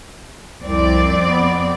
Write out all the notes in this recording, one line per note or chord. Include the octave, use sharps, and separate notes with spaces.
C2 F2 C4 D5
B3